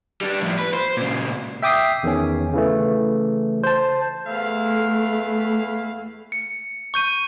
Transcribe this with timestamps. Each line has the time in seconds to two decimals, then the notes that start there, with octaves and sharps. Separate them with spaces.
0.21 G3 D4
0.42 A2 F3
0.59 B4
0.74 C5
0.97 A#2 C#3
1.62 E5 G5 D6 D#6 B6 C7
2.03 E2 D#3 C#4
2.53 C#3 E3 A3
3.63 C5 A5
4.27 E2 A3 E4 F5
6.32 C#7
6.94 C#6 G6 D#7